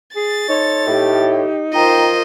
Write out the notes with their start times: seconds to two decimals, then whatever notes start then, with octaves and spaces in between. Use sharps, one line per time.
0.16 G#4 A6
0.49 D#4 A4 C5 C#5
0.87 A2 G4
1.74 F4 A#4 C5 D#5 G5 A#5